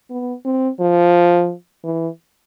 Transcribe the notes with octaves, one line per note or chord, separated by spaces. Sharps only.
B3
C4
F3
E3